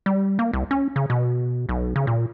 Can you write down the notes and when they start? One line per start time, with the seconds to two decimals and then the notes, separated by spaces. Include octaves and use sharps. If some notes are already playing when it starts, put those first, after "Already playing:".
0.06 G3
0.39 A#3
0.53 C2
0.71 C#4
0.96 C#3
1.10 B2
1.69 B1
1.96 C#3
2.07 A#2